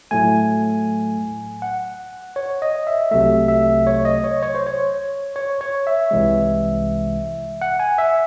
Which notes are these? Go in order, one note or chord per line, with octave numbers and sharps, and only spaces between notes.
A2 F#3 A3 G#5
F#5
C#5
D#5
E5
C2 C3 F#3 A3 E5
E5
C#5
D#5
C#5
C#5
C5
C#5
C#5
C#5
E5
C2 C3 E3 G#3
F#5
G#5
E5